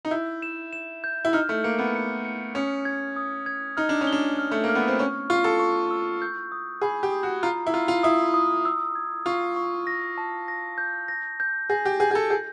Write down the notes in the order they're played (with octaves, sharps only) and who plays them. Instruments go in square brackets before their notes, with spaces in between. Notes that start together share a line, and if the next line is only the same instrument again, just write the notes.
[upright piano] D#4
[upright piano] E4 [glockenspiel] G6
[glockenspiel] E7
E7
G6
[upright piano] E4
[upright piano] D#4 [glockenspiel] F6
[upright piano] A3
[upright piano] A#3 [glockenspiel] C#7
[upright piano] B3
[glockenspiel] C#7
C#7
[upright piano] C#4 [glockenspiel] D#6
[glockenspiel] G#6
D#6
G#6
[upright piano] D#4 [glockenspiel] F6
[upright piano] D4
C#4
[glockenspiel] G7
[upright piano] D4
[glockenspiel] F6
[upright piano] A3
A#3
[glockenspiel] F6
[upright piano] B3
C4
[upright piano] C#4 [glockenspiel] C#6
[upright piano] F4 [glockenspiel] C#6
[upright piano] A4
[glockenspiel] C#6
E6
G6
D#6
[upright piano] G#4 [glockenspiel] B5
[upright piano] G4
[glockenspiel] D#6
[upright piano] F#4
[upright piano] F4 [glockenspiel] A#5
[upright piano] E4
[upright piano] F4 [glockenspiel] A#5
[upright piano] F4
[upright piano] E4 [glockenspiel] D#6
[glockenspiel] D#6
E6
G#6
[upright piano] F4 [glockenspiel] C#6
[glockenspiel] C#6
A#6
A5
A#6
G6
A#6
G6
[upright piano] G#4 [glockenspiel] A#6
[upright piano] G4
[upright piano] G#4 [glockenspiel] G6
[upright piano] G#4
A4
[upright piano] G#4 [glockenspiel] G6